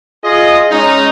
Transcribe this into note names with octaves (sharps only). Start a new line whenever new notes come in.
F4 G#4 D#5
G#3 C#4 D#4